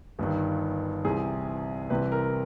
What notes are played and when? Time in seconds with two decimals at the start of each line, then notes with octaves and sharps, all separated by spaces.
0.19 G1 G2 D#3
1.04 C2 C3 E3 G#4
1.90 C2 C3 E3 B4
2.12 A#4